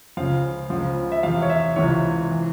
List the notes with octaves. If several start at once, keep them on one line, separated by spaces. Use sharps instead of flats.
C#2 C#3 F3 F5
C#2 C#3 F3
E5
E2 C3 F3 F5
C#5
E5
C#2 C3 E3 C#5
E3